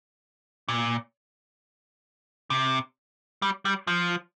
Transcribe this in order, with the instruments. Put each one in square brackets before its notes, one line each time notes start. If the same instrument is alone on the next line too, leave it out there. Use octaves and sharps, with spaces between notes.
[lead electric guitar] A#2
C3
G3
G3
F3